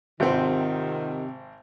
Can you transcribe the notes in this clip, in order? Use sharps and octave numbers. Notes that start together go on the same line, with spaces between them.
G#1 C3 D#3 C4 F4 F#5 G6